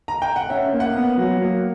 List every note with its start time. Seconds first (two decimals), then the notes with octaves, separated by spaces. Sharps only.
0.08 A#5
0.22 G5
0.36 F#5
0.50 C#4 E5
0.73 A#3
0.80 F#5
0.95 B3
1.18 F#3
1.41 A#3